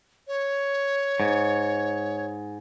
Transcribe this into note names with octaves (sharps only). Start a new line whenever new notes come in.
C#5
G#2